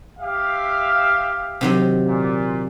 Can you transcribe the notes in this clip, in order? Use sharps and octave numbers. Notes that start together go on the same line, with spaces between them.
G4 E5 F5
C3 D#3 F#3
A#2